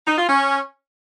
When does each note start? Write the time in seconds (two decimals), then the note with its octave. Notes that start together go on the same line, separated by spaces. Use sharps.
0.07 D#4
0.18 F4
0.29 C#4